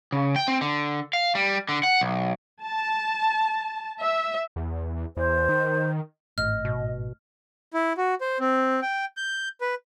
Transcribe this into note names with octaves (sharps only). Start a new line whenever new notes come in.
C#3
G5
C4
D3
F5
G3
D3
F#5
B1
A5
E5
E2
E2 C5
D#3
G#1 A2 D#5 F6
B2
E4
F#4
C5
C4
G5
G6
B4